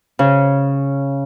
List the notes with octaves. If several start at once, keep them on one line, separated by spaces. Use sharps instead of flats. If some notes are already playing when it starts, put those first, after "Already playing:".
C#3